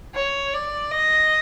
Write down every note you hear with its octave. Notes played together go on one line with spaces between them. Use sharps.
C#5
D5
D#5